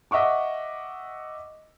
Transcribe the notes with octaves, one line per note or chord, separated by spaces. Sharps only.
D#5 E5 F#5 C#6 D6